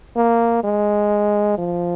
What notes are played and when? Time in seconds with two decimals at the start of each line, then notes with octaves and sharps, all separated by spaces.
0.16 A#3
0.64 G#3
1.58 F3